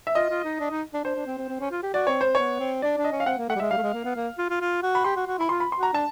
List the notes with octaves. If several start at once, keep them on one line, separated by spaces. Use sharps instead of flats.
E5
F4 D#5
F4
D#4
D4
D#4
D4
D4 C5
D4
C4
C4
C4
C#4
F4
G4
F#4 D5
C4 C#5
C4 C5
B3 C#5
C4
D4 D5
D4
D#5
C#4
F5
C4 F#5
A#3
A3 F#5
G3
G#3 E5
G3 F5
A3
G#3
A#3
B3
A#3
F4
F4
F4
F#4
B5
G4 C6
F#4
F#4
E4 B5
F4 C6
B5
C6
F#4 A#5
D4 A5